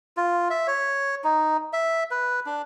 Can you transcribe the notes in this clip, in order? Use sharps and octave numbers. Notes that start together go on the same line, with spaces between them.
F4
E5
C#5
D#4
E5
B4
D4